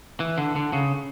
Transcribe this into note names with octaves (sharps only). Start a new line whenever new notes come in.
E3
D3
D3
C#3